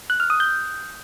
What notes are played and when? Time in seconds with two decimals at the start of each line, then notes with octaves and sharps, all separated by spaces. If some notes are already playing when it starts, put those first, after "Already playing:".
0.10 F#6
0.20 F6
0.30 D#6
0.40 G6